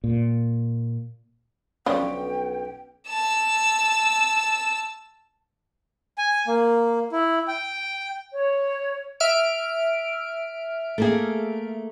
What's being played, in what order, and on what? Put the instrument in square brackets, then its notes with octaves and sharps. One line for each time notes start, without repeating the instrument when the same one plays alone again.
[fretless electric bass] A#2
[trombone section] B1 B3 [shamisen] D3 F3 [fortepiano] C#4 [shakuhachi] G5
[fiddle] A5 E6
[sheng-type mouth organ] G#5
A#3
E4
G5
[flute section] C#5
[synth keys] E5 F6 D7
[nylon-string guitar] A3 A#3 G#4